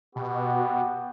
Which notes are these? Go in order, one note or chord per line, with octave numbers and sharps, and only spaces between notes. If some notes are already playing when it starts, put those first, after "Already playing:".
B2 B3 F#4 G4